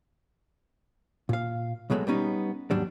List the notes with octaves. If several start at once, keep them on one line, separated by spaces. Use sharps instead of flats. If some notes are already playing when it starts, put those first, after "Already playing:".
A#2 F5
C2 B2 F#3 G#3 A3
G3 B3 C#4 D#4
D#2 G#2 F#3 G3 D4